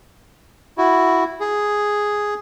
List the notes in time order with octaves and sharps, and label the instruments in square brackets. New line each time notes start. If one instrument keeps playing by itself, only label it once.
[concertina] E4 F#4
G#4